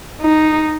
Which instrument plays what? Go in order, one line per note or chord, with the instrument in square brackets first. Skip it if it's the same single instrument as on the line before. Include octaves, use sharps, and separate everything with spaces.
[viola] D#4